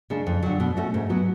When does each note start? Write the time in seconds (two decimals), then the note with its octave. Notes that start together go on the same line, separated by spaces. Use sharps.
0.10 C#3 G#3 D4
0.27 F2
0.43 D3 F#3
0.60 B2
0.77 A3 C#4 F#4
0.94 G#2
1.09 F#3 B3 F#4